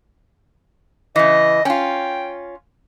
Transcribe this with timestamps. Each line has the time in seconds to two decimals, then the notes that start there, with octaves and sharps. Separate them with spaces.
1.16 C#3 E3 D#5
1.65 C#4 F4 G5